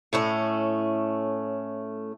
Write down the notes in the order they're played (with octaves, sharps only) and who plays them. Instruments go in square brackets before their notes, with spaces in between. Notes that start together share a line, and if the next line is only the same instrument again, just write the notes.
[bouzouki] A2 A3 C#4